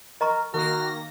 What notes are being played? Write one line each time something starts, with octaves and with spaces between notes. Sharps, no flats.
A#4 D#5 A#5 C#6
D#3 A#3 F#4 A#4 A#6